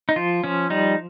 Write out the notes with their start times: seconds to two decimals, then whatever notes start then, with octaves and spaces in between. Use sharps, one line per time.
0.09 D#4
0.16 F3 F4
0.44 F3 C#4
0.70 G3 D#4